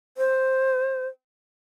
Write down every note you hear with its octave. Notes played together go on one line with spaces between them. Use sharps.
C5